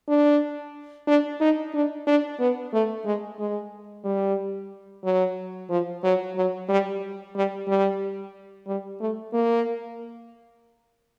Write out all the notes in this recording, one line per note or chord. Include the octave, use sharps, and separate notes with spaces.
D4
D4
D#4
D4
D4
B3
A3
G#3
G#3
G3
F#3
F3
F#3
F#3
G3
G3
G3
G3
A3
A#3